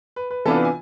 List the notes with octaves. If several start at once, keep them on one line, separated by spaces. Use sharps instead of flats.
B4
B4
C3 E3 B3 D4 F4 A4
B4
G#5